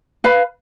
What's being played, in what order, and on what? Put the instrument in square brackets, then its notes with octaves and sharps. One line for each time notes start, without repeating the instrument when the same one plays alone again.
[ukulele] B4 F5 B5